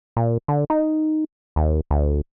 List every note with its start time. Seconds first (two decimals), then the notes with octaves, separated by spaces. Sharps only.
0.17 A#2
0.48 D3
0.70 D#4
1.56 D#2
1.91 D2